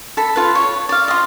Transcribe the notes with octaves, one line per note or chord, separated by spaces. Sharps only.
A4 B5
F4 B4
C#5
D5 F5
F4 D#5